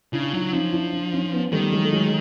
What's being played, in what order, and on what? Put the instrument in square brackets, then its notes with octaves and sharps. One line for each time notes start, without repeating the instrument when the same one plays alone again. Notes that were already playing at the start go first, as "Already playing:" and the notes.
[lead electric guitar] C#3 [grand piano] D4 E4
[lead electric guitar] F#3 [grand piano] D#4 F4
[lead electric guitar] F3 [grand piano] C#4 D#4
[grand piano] D4 E4
D4 E4
C#4 D#4
B3 C#4
[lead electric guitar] D#3 [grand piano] G3 A3
[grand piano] F#3 G#3
A3
F#3 G#3